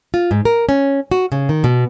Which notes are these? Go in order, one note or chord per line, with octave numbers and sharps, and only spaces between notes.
F4
G#2
A#4
C#4
F#4
C#3
D#3
B2